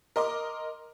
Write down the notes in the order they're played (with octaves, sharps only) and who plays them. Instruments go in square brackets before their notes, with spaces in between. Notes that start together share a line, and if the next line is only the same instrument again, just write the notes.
[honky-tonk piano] A#4 D#5 C6 D6